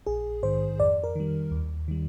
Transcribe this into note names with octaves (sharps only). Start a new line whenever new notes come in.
A#1 G#4
G#2 D#3 C5
F2 D5
A#4
D#3 G3
D#2
D#3 G3